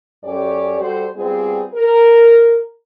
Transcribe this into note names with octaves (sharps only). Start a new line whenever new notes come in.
F#2 C#4 G4 A4 C#5 D5
G3 F#4 A4 C5
G3 B3 C4 F4 G#4
A#4